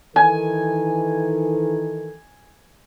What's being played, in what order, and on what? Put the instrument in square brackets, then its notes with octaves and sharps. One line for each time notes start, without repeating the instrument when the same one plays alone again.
[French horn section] D#3 E3 A4 [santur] G#5